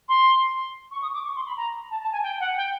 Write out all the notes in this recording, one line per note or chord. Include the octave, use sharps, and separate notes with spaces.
C6
C#6
D#6
D6
C#6
C6
B5
A#5
A5
A5
G#5
G5
F#5
G5